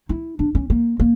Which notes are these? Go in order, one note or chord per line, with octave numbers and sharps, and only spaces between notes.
E4
D4
C#4
A#3
A#3